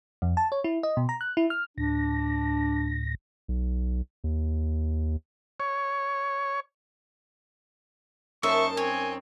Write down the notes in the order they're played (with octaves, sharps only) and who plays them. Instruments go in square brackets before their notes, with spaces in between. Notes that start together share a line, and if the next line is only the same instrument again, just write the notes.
[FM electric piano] F2
A5
C#5
E4
D#5
B2
A#5
F#6
E4
F6
[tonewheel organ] D2 A2 A#6 [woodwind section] D4
[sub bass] B1
D#2
[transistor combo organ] C#5
[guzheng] F#2 A#3 D#4 [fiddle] C5 A5 [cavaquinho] E5 [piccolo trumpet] C#6
[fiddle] C4 [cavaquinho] C#5 [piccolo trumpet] G#5